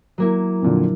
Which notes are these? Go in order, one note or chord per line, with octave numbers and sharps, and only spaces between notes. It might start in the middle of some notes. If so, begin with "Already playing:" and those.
F#3 A#3 E4
F2 A#2 D3